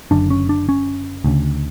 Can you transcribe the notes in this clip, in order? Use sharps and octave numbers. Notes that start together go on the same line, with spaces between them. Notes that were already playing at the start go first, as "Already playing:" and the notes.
F#1 F#2 D3 D4
C#4
D4
C#4
D2 C#3